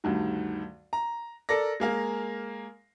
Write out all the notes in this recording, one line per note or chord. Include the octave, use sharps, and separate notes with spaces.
D2 G2 D#3
A#5
A4 A#4 D5 A#6
G#3 A#3 F5